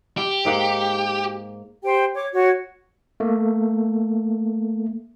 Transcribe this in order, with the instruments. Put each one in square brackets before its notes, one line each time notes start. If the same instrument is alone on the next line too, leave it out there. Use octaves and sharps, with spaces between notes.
[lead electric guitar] G4
[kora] G#2 A#3 F#5
[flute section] G4 C5 G5
C#5 D6
F#4 C#5
[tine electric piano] A3 A#3